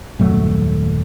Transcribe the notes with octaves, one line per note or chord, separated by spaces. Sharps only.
D#1 F#2 F#3 A3